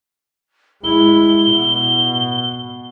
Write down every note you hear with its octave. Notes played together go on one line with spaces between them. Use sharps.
G#3 E4 G7
B2